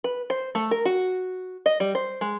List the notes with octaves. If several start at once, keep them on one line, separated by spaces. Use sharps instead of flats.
B4
C5
A3
A#4
F#4
D#5
G3
C5
G#3